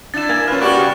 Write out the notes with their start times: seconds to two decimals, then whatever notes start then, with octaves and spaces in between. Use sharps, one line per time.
0.14 D4 E4 A6 E7
0.29 A#3 G#5
0.48 C#4 F4 B4 F6
0.61 G3 A#3 F#4 G4 D5
0.78 C#3